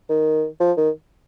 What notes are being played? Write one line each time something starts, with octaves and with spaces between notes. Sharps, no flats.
D#3
F3
D#3